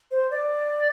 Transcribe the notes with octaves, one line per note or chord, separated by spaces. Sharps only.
C5
D5